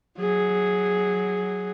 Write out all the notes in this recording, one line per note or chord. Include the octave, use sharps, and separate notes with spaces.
F#3 G#4